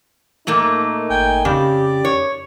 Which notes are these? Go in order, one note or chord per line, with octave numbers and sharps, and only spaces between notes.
A#2 A3 A#3 D#4
G#1 G5 G#5
F2 C#3 C#4 G4 D5
C#5